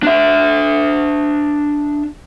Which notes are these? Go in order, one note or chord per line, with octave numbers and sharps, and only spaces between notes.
D4 E5